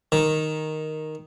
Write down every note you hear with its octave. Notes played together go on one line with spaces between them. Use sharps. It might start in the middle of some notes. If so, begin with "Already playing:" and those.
D#3